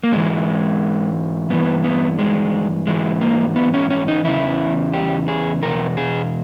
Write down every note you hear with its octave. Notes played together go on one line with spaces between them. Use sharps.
A#3
G#2 E3 G#3
G2 E3 B3
B3
G#3
G#2 E3 G#3
A#3
B3
C#4
C#4
D#4
E2 C#3 E3 E4
G4
G#4
E2 B2 A#4
G#4